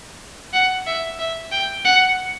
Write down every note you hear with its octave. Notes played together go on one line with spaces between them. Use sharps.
F#5
E5
E5
G5
F#5